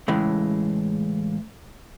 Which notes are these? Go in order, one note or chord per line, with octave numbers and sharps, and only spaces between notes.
A2 C#3 E3 G#3